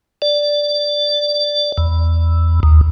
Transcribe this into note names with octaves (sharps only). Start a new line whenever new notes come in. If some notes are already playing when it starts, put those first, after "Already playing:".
D5
E2
D#2